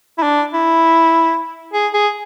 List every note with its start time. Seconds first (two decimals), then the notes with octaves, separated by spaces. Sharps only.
0.18 E4
0.23 D4
0.53 E4
1.73 G#4
1.93 G#4